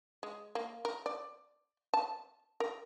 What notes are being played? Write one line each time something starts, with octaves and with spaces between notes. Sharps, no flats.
G#3
A#3
A#4
D5
A5
A#4